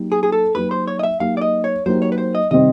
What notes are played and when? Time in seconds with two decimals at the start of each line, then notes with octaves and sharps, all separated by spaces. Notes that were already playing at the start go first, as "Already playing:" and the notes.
Already playing: F#3 A#3 D#4 G4
0.12 G#4
0.23 G#4
0.32 A4
0.55 F#3 A#3 D#4 G4 B4
0.71 C5
0.87 C#5
0.99 D#5
1.03 E5
1.20 F#3 A#3 D#4 G4 F5
1.37 D5
1.41 D#5
1.64 C#5
1.86 F#3 A#3 D#4 G4 C5
2.02 C#5
2.12 B4
2.18 C5
2.35 D#5
2.51 C3 D#3 G3 C4 D#5